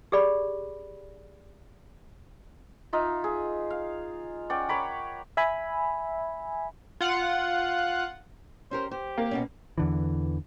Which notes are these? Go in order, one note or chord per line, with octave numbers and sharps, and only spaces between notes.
G4 G#4 D5 B5
D#4 F4 E5
G#4
F5
C#4 D5 F#5 G5
A#4 C#5 B5 D6
E5 G#5 B5
F4 F#5
C#4 G4 A#4 C5
G4 C5
A#3
B2 B3 C#4
E2 D3 E3